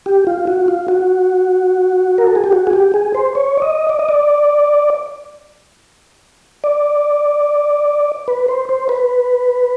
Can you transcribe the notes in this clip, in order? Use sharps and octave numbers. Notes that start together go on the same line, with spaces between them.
G4
F4
F#4
F4
F#4
A#4
A4
G#4
G4
F#4
G#4
G4
G#4
C5
C#5
D5
D#5
D5
D#5
D5
D5
B4
C5
C5
B4